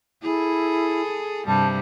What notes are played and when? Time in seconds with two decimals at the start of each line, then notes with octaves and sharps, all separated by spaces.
0.22 E4 G#4 A4
1.47 G2 C3 G3 A5